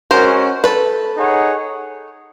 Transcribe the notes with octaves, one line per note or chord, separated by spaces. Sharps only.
G#3 C#4 F#4 A#4 C5
A4 B4
D#4 G#4 C#5 F#5